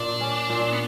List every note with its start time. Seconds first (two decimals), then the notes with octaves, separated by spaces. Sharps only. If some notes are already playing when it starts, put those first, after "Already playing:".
Already playing: A#2 D4
0.21 C#4
0.49 A#2
0.72 B3